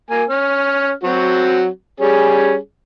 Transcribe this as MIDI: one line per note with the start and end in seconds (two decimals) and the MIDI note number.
0.10 0.24 58
0.10 0.24 70
0.10 0.24 80
0.30 0.91 61
0.30 0.91 89
1.04 1.66 54
1.04 1.66 60
1.04 1.66 66
2.00 2.56 55
2.00 2.56 61
2.00 2.56 68